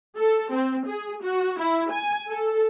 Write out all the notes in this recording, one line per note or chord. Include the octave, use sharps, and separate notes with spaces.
A4
C4
G#4
F#4
E4
G#5
A4